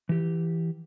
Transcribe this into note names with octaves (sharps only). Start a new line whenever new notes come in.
E3 G4